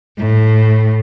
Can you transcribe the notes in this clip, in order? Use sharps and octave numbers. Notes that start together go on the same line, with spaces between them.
A2